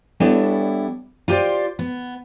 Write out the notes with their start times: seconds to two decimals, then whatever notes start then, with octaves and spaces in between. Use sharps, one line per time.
0.20 G3 B3 D4 E4 A4 C#5
1.28 F4 G4 A4 C5 D5
1.79 B3